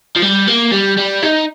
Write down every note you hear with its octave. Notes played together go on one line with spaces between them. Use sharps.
F3
G3
A#3
G3
G3
D#4